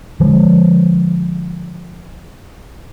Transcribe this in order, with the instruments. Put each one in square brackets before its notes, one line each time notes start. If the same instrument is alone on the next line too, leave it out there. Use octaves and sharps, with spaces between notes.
[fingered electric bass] D3 F3 G#3